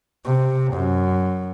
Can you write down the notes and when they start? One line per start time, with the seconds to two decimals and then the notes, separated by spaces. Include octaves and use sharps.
0.25 C3
0.73 F#2